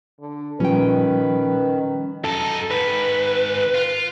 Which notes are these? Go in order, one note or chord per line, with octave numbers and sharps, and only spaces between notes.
D3
A#2 D#3 F3 G3 C#4 B4 G5
F#2 D#4 A4
G#2 D#3 B4
F4